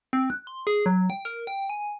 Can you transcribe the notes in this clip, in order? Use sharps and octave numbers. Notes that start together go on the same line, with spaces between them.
C4
F#6
C6
G#4
F#3
G5
A#4
G5
G#5